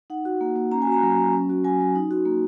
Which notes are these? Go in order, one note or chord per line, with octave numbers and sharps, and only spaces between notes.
D#4 F#5
F#4
A#3
A#3
C#4 A#5
G#5
F#4
A#5
F#3
F#3
C#4
F#4
F#3 G#5
F#3
D#4
F#4
A#3